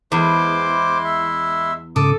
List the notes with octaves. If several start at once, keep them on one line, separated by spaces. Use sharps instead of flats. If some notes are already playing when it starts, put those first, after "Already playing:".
E2 G#3 E4 C5 C6 D6
E5
G#2 C#3 A4 D6 D#6